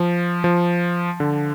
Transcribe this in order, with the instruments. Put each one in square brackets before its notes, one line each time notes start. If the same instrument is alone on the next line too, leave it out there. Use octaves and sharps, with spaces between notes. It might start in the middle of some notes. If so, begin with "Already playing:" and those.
Already playing: [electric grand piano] F3
F3
D3